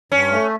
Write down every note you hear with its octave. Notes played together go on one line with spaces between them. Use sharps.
G2 C#4
A3